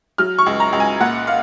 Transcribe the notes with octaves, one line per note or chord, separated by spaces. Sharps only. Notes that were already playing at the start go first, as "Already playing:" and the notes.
F#3 F6
C#6
C#2
A#5
C#2
G#5
A#2 F#5
F5